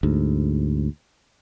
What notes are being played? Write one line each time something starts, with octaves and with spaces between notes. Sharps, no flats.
D2 G#2